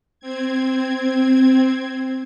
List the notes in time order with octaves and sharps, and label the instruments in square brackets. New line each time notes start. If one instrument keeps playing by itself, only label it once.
[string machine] C4 G#6